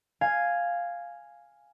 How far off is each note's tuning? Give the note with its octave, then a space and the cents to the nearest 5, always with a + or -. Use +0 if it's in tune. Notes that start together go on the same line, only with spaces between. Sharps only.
F5 +0 G#5 +0